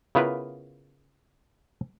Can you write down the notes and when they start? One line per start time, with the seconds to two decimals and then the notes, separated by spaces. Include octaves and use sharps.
0.15 C#3 B3 E4 F4 A#4 B4